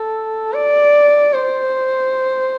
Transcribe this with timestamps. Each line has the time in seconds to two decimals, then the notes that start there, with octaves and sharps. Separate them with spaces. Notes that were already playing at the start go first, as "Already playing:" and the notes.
Already playing: A4
0.53 D5
1.33 C5